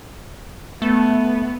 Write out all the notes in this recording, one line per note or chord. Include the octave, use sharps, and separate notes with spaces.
A3 B3